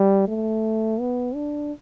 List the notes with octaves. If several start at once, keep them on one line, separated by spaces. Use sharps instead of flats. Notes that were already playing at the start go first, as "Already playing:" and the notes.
Already playing: G3
A3
B3
D4